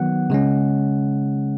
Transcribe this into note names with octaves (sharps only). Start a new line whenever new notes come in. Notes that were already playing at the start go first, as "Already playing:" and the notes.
Already playing: D#3 F#3 B3 F#5
C#3 G#3 C#4